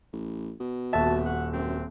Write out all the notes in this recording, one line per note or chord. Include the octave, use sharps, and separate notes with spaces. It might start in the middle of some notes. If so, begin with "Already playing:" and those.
A1
B2
D#1 F#4 E5 A5
F#5
F#2 C4